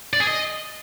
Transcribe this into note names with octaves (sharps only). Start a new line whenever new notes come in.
D5
G#4
D#5